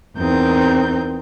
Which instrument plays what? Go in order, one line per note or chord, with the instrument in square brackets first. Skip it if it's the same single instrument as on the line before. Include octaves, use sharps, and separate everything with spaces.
[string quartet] E2 C4 D#4 A#4 G6